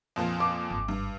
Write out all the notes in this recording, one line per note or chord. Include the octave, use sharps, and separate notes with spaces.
F2 A#2 F3
D6
G#1
G2